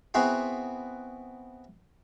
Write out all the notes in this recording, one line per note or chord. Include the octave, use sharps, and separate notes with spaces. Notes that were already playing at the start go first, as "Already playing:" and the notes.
B3 C4 E4 F#4 G#4 C6